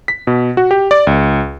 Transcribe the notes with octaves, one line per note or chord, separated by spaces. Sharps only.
B6
B2
F#4
G4
D5
C#2